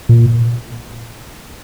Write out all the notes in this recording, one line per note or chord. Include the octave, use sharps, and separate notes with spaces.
A#2